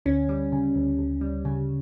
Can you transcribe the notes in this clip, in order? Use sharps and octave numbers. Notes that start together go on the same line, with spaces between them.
D2 C#4
G3
C#3
D2
D2
G3
C#3